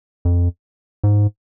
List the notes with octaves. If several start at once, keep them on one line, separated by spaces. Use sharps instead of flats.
F2
G#2